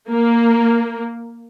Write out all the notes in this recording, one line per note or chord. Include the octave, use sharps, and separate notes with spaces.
A#3